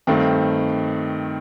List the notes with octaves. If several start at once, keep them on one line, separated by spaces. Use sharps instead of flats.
G2 D#3 A3 C4